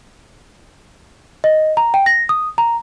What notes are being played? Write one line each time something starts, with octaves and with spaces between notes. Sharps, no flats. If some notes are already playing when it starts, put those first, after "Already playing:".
D#5
A#5
G5
A#6
D#6
A#5